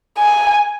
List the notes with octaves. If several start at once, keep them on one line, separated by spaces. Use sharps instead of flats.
G#5